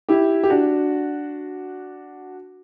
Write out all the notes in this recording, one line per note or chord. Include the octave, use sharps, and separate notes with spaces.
E4 G4
G4
D4 F#4